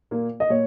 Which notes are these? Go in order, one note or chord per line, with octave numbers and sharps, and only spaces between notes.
A#2 A#3
D#5
A#2 C#5